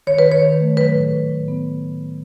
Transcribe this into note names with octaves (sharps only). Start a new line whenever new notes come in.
D#3 C#5
B4
D#3
C#5
D#3
A3
F#3 B4
A2
A2
A2
B3